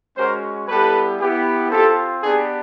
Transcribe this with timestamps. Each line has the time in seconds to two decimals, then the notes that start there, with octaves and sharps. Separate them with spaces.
0.17 G#3 C#4 F#4 A#4 C5
0.68 G3 B3 E4 G4 A4 B4
1.20 B3 E4 G4
1.71 C4 F4 G4 A4
2.22 B3 D4 G4 G#4